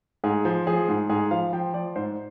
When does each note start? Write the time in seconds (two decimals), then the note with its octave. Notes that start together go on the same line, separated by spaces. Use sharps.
0.24 G#2 G#4
0.45 F3
0.67 F3 G#4
0.89 G#2
1.09 G#2 G#4
1.31 F3 F5
1.53 F3 G5
1.74 F3 D5
1.96 G#2 C5